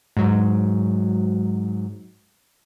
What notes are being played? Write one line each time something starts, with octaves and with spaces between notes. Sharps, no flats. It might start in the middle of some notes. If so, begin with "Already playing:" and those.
G#2 F#3